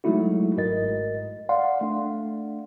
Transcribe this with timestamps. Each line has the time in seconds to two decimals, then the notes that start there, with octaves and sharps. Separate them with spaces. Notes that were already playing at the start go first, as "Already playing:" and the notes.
0.04 F#3 G#3 A3 D#4 E4 F#4
0.57 G#1 G#2 A#4 D#5 A6
1.49 D5 F5 F#5 C6
1.81 A3 D4